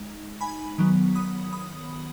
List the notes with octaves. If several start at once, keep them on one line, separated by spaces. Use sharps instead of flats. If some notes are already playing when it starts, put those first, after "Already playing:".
Already playing: G#3 D#4
G#5 B5
D#3 F#3 B3
B5 D#6
B5 D#6